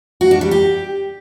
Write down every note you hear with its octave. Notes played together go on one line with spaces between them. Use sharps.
F#4
D4
G3
G4